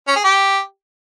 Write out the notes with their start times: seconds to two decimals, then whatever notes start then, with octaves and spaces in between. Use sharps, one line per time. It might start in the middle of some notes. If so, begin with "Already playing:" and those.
0.08 C#4
0.16 G#4
0.24 G4